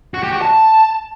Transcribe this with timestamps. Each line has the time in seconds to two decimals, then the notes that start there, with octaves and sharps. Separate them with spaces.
0.14 F#4
0.23 G4
0.33 F#4
0.42 A5